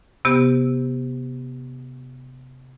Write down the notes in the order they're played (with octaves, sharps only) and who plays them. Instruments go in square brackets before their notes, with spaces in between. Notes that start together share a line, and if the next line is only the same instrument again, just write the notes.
[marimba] C3 B3 G4